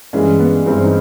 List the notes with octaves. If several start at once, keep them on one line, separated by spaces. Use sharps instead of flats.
G2 E3 G#3 C#4
B3
G2 E3 G#3 C4
D#4